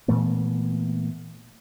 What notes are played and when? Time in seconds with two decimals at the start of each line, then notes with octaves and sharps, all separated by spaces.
0.08 A#2 E3 A3 B3